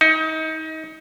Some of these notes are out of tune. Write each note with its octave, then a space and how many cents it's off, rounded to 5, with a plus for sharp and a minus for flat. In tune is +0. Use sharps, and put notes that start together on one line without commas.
D#4 +30